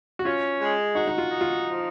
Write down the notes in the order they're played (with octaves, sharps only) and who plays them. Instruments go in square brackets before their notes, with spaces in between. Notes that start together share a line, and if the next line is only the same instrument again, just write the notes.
[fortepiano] F#4
[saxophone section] C#4 [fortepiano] F4
[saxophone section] G#3
[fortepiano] D#4 [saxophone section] F#4
[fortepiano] D#4
F4
[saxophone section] D#4
[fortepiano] F4
[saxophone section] F3